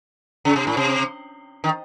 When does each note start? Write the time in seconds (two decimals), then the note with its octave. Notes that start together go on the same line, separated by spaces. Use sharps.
0.45 C#3
0.56 C3
0.67 A2
0.77 C3
1.64 D#3